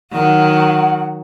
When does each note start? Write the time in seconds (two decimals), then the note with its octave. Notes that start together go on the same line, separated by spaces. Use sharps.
0.12 D#3 F#3 F#5